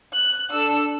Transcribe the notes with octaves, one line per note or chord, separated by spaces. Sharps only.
F#6
D4 A4 E6